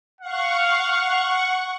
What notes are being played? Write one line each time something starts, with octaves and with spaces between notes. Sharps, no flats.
F5 F#5 C#6